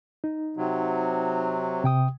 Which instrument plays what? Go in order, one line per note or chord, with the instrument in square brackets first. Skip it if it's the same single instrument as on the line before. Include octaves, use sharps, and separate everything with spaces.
[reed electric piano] D#4
[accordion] C3 F#3
[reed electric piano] C3 G5 D#6